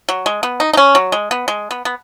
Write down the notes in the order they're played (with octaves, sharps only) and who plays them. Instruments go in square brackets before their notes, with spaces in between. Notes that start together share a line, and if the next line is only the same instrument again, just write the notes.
[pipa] F#3
G#3
B3
D#4
D#4
C#4
F#3
G#3
B3
G#3
B3
B3